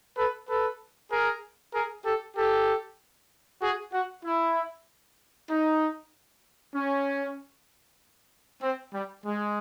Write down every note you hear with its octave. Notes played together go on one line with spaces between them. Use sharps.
A4 B4
A4 B4
G#4 A#4
G#4 A#4
G4 A4
G4 A4
F#4 G#4
F#4
E4
D#4
C#4
C4
G3
G#3